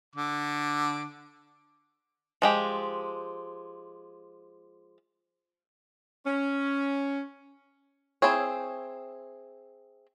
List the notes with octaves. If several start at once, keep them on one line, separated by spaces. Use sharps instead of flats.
D3 D6
F3 G#3 G4
C#4
C4 E4 G#4 C#5